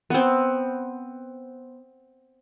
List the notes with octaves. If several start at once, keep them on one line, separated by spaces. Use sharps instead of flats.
B3 C4